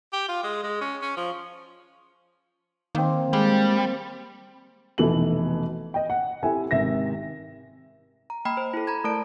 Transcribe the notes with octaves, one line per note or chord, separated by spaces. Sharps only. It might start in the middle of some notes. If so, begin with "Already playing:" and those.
G4
F4
G#3
G#3
C#4
C#4
F3
D#3 A#3 C4
G3 G#3
F1 B2 E3 A4 F#7
D#5 G5
F#5
C4 E4 G4 A4 E5 G#5
G#1 C3 E5 A#6
A#5
A#3 G5 B5 F6
C5
E4 A4
A#5 B5 G#6
A3 A#4 D5 A5 D7